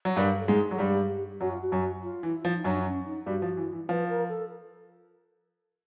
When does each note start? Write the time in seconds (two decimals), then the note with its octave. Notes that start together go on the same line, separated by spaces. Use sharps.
0.05 F#3
0.16 G2 G3 A#4
0.38 A4
0.48 G#2 G#3 G#4
0.71 F#3
0.74 G#4
0.78 G2 G3 G4
1.41 F#2 F#3 F#4
1.51 F4
1.61 F#4
1.72 F#2 F#3
2.03 F4
2.23 E3
2.33 E4
2.45 F3
2.56 D#4
2.64 F#2 F#3 D4
2.85 C#4
3.06 D#4
3.26 G2 G3 F#4
3.42 F3
3.57 E3
3.72 E3
3.89 F3 B4
4.09 A#4
4.29 A4